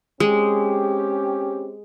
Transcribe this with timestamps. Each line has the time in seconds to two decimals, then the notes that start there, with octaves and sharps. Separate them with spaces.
0.20 G#3 C4 C#4 G4